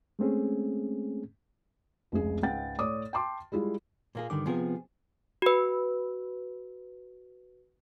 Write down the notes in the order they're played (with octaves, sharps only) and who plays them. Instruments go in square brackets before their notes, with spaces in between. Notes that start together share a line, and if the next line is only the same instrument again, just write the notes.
[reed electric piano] G#3 A3 C4 C#4 G#4
[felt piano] F1 C#2 G#4
C#2 G#2 F#5 G5 A6
A2 C#5 D5 D6 D#6
G5 A5 C6 D6
G3 G#3 E4 F4
[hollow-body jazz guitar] A#2 A#3 G#4
[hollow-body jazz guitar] G2 D#3 [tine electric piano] D3 D6
[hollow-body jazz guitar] C3 F3 G#4 [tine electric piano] B3 F4 B4
[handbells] F#4 B4